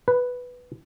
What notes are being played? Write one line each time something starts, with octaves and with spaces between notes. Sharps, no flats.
B4